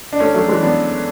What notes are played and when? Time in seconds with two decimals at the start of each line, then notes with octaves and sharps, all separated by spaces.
0.13 D4
0.20 A3 C#4
0.34 F#3 A3
0.48 E3 G#3
0.63 B3 D4